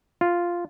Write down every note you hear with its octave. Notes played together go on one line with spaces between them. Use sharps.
F4